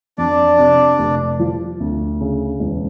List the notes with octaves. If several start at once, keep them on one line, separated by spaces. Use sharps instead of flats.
F2 D4 D5
C3
F1
F3
D2
C#3
E1